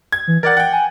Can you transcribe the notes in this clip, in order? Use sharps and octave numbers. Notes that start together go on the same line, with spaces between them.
G#6
E3
A#4 D5 F#5 A6
F#5 G5
G#5